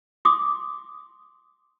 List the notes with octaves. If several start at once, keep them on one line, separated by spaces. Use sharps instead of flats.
C6 D6 D#6